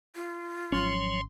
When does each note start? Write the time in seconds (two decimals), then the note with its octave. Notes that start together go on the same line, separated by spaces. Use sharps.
0.15 F4
0.72 G#1 F3 F#3 C#4 C#5 C6